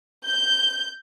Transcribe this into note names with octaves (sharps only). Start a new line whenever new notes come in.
G6